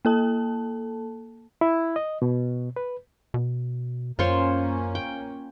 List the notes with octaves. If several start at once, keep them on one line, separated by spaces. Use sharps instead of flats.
A#3 A4 A5
E4
D#5
B2
B4
B2
F#2 A#3 C#4 F4 C5 C#5
G5